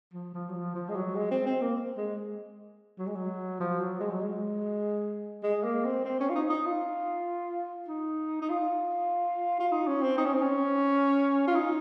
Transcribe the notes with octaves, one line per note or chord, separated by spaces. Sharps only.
F3
F3
F#3
F3
F3
G#3
F#3
G#3
C4
C4
A#3
G#3
F#3
G#3
F#3
F3
F#3
G#3
F#3
G#3
G#3
A#3
C4
C4
C#4
F4
D#4
D#4
F4
D#4
D#4
F4
F4
D#4
C#4
C4
D#4
C#4
C4
C#4
F4
D#4